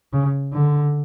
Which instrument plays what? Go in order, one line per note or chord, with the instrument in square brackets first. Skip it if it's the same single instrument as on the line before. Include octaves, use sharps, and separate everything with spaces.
[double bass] C#3
D3